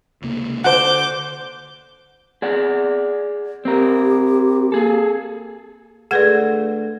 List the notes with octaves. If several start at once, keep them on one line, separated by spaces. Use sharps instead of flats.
C#2 C3 A#3
D3 F#4 C5 F#5 D6 G6
G#4 D5 F#5
C4 G4 A#4
A#3 G#4 A4
D2 A3 F4 G#4 B4 D5 F#5 G#6